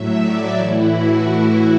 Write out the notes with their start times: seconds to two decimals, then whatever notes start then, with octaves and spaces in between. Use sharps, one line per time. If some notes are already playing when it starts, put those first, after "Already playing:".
Already playing: A2 F#3 E5
0.21 D5
0.55 A2 E3 E4
0.91 F#4